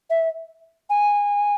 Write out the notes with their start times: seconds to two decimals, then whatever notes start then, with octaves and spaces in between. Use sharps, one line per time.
0.10 E5
0.90 G#5